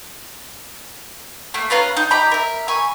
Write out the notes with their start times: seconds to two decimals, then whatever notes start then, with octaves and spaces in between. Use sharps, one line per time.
1.54 A3 A#3
1.70 C#4 F4 B4 A#5
1.97 D#4
2.11 G4 D#5 A#5 B5
2.32 A#4 E5
2.68 G#5 B5 C#6